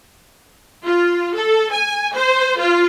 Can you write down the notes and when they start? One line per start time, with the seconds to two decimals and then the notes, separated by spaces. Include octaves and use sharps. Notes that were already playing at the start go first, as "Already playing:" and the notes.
0.85 F4
1.35 A4
1.71 G#5
2.14 C5
2.58 F4